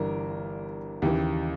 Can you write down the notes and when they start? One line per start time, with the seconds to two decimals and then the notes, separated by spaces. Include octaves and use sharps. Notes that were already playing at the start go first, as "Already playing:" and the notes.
Already playing: G1 G2 E3 A#4
1.02 D#2 C#3 E3 G4